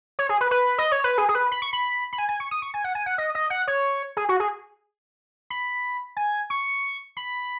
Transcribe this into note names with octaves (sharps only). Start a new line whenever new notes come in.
C#5
G#4
B4
B4
D#5
C#5
B4
G#4
G#4
B4
B5
C#6
B5
B5
G#5
G#5
C#6
D#6
C#6
G#5
F#5
G#5
F#5
D#5
D#5
F#5
C#5
G#4
F#4
G#4
B5
G#5
C#6
B5